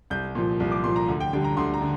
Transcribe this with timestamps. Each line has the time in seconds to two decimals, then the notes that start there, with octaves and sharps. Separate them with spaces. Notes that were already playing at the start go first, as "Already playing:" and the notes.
0.10 C2 G6
0.35 A#2 F3
0.60 C2
0.71 D6
0.84 A#2 C6
0.88 F3
0.96 A#5
1.08 D2
1.20 G5
1.33 D3 G3 G5
1.44 A#5
1.57 D2 C6
1.74 A#5
1.81 D3